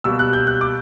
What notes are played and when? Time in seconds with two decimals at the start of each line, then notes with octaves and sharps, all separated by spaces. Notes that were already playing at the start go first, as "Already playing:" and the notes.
0.04 B2 G3 A#3 E6
0.19 F#6
0.33 G6
0.47 F#6
0.61 D6